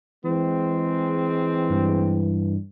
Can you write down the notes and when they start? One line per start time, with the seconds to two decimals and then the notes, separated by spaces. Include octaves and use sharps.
0.24 E3 G#3 C4
1.69 G2